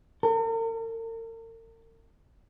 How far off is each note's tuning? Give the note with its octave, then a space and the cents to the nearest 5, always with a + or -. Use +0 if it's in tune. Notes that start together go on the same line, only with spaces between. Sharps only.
A#4 -45